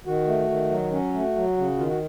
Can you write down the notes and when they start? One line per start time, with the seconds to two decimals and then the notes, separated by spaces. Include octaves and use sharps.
0.06 D#3 F#4
0.27 A3
0.49 D#3
0.71 F#3
0.92 C#4 F#4
1.14 A3
1.36 F#3
1.57 C#3
1.78 D#3 F4
1.89 F#4